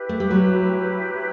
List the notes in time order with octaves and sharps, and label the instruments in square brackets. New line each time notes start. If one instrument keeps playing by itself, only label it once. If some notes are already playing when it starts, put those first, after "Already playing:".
Already playing: [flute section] E4 G4 B4
[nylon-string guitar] A3
G3
F#3